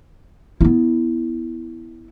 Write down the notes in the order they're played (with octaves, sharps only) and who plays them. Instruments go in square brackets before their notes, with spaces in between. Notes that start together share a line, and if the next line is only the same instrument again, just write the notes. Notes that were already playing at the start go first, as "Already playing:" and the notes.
[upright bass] B3 E4